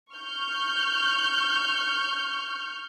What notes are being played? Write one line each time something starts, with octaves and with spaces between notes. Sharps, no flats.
C#6 F6 G6